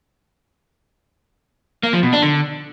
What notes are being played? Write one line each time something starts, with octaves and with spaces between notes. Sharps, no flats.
A#3
F3
B2
D4
D3